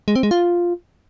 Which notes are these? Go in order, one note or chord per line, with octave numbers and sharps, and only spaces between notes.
G#3
C4
G#3
F4